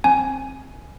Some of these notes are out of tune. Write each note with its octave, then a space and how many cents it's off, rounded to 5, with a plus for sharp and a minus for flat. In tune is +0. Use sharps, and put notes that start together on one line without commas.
C4 +25 G#5 +10